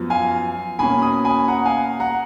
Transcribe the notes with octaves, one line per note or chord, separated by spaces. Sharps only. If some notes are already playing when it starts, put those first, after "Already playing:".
Already playing: F#2 F3 B3
F5 G#5
B2 A#3 C#4 G#5 B5
B5 D#6
G#5 B5
F#5 A#5
F5 G#5
F#5 A#5